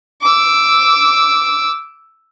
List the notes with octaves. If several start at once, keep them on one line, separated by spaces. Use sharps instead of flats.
D6 E6